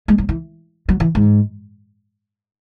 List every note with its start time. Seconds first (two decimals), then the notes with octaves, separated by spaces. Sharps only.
0.08 G#3
0.18 F#3
0.29 E3
0.89 F#3
1.00 E3
1.15 G#2